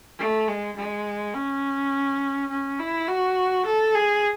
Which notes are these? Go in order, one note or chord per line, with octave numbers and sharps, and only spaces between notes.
A3
G#3
G#3
C#4
C#4
E4
F#4
A4
G#4